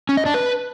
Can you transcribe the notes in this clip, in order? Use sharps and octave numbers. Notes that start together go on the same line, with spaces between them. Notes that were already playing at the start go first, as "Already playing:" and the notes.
C#4
D#5
D4
B4